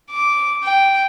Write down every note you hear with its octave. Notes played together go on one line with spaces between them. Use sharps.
D6
G5